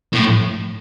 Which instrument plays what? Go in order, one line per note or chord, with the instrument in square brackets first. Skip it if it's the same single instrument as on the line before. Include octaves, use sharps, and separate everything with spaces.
[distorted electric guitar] A2